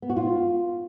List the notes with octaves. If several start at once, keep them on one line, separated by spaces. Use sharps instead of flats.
B3
F#4
F4